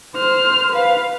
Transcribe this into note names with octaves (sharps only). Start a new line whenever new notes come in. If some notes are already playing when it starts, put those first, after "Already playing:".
C5 F6
B4 F5